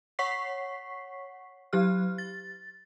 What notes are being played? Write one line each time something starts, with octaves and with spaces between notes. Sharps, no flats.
C#5 F#5 C#6 B6 C7
F#3 G4 F6
A6